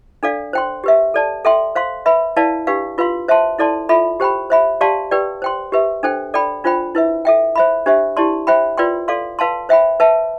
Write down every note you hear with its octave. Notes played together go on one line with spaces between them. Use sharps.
D4 A4 D5 F5
C5 G5 C6
G4 B4 E5
A4 D5 A5
A4 E5 G5 C6
C5 F5 C6
B4 E5 B5
E4 B4 D5 F5 A5
D4 G4 B4 F5
F4 B4 F5 C6
C5 E5 A5 C6
E4 A4 D5 A5 C6
F4 A4 E5 B5
G4 C5 G5 B5
C5 E5 B5
G4 D5 F5 A5 C6
G4 B4 D5 G5
C5 G5 C6
G4 B4 E5
D4 A4 C5 G5
A4 D5 G5 B5
D4 F4 C5 G5 B5
E4 B4 E5
A4 E5 G5
C5 E5 B5
D4 G4 C5 E5
E4 G4 D5 A5 C6
C5 E5 G5 B5
F4 B4 D5 G5 C6
A4 D5 F5 C6
B4 F5 A5 C6
C5 E5 G5 B5
B4 E5 A5